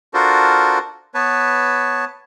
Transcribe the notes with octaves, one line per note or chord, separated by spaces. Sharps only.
D4 F4 F#4 A4 A#4 C5
B3 B4 C#5 A5